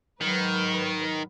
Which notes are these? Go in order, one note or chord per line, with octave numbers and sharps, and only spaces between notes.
G#2 D#3 F#3 B4